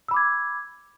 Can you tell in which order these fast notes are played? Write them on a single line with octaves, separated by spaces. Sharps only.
E6 B5 D6 G#6